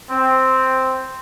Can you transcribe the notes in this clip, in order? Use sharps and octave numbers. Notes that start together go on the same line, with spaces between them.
C4